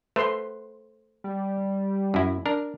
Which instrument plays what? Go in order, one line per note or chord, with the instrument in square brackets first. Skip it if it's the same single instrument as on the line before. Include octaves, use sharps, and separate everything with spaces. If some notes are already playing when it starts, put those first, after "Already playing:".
[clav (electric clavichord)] A3 [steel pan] B4 C5 C6
[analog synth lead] G3
[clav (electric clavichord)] F#2 E4
D4 A#4